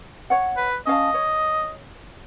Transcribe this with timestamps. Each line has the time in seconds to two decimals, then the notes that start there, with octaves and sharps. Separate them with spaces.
0.30 C#5 F#5
0.57 B4
0.87 C#4 D#5 F5 A5
1.14 C#5